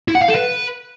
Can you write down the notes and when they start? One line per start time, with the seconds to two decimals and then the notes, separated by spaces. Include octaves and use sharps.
0.08 E4
0.15 F#5
0.22 F5
0.29 A4
0.36 B4